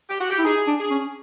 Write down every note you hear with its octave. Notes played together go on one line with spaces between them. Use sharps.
G4
F#4
G4
E4
D#4 G#4
D4
G#4
C#4